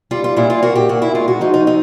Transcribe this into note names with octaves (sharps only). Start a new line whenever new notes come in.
G3 F4
F4
A#2 E4
F4
A#3 F#4
G4
A#2 F#4
E4
G#3 F4
F#4
F3 D#4
D#4
C4 D#4